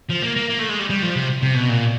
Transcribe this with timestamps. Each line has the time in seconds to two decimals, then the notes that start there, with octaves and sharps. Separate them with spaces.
0.10 F3
0.23 A#3
0.37 A#3
0.50 A#3
0.60 A3
0.69 G#3
0.79 G3
0.90 G3
1.02 F3
1.16 C3
1.42 C3
1.55 B2
1.69 A#2